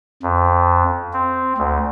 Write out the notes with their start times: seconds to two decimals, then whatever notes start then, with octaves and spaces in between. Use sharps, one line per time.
0.23 F2
1.13 C4
1.58 D2